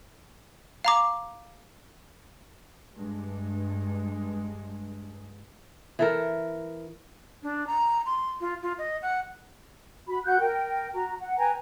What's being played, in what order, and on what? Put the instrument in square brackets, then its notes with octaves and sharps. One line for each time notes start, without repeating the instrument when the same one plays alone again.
[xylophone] F5 A#5 D6
[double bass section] G2 G#3
[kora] E3 A4 A#4
[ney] D4
A#5
C6
F4
F4
D#5
F#5
[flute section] F#4 B5
F#4 F#5 F#6 G6
A#4 G5
F#4 A#5
F#5
B4 G5 G#5 A#5